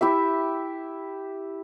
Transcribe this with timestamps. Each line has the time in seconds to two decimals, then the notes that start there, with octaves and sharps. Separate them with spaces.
0.01 E4 G4 E5